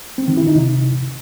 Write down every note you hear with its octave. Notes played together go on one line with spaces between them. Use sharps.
C4
D#3
E4
D#4
C3